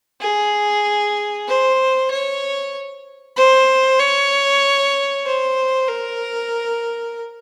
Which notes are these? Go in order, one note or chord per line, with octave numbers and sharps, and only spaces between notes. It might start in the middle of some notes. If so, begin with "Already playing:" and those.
G#4
C5
C#5
C5
C#5
C5
A#4